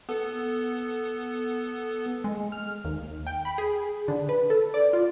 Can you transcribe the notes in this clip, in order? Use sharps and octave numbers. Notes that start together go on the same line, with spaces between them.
B3 A4
G#3
F6
D#2
G5
B5
G#4
D3
B4
A4
D5
F4